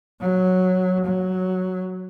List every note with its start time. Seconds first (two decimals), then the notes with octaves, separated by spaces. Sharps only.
0.21 F#3
1.05 F#3